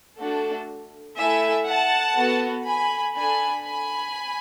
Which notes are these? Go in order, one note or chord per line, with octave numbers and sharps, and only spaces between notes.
A3 D4 F#4 A4
A3 E4 A4 E5 G#5
F#5 A5
B3 F#4 A4
G#5 B5
D4 A4 G#5 B5
G#5 B5